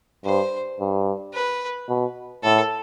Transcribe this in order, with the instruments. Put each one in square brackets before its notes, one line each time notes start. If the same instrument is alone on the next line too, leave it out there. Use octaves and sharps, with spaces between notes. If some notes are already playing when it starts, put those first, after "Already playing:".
[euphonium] G2 [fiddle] C5
[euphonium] G2
[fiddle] B4
[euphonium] B2
[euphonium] A2 [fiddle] A4